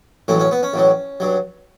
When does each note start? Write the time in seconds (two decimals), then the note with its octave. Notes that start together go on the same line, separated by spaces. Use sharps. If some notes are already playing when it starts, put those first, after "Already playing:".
0.28 A1 A2 F#3 C#4
0.40 C#4
0.51 B3
0.63 C#4
0.74 A1 A2 F#3
1.20 G2 F#3